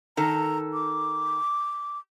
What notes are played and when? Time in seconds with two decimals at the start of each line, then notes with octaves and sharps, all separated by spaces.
0.17 D#3 A4 A#5
0.73 D6